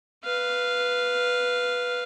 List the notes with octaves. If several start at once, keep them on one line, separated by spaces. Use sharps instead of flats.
B4 F5